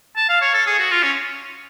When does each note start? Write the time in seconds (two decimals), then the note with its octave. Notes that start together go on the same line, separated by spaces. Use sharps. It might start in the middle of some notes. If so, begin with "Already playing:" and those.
0.16 A5
0.29 F5
0.42 C#5
0.54 A4
0.67 G#4
0.79 F#4
0.91 F4
1.03 C#4